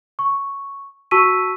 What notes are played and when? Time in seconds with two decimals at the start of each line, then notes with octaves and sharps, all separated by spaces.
0.19 C#6
1.11 F#4 A5 C#6 E6 B6 D#7